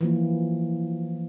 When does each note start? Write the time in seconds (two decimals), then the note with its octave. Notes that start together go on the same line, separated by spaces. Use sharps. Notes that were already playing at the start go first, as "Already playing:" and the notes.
0.01 E3 F3 A#3